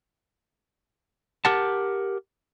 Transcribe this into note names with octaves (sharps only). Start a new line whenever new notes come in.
G4 A#4 F#5 A5